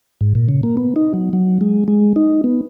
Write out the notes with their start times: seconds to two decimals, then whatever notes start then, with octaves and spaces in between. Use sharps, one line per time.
0.21 G#2
0.35 A#2
0.49 C#3
0.63 A#3
0.77 B3
0.96 D#4
1.14 F#3
1.33 F#3
1.61 G#3
1.88 G#3
2.16 D#4
2.44 B3